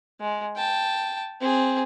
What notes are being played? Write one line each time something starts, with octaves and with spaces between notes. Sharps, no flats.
G#3
G5 A5
C4 G#4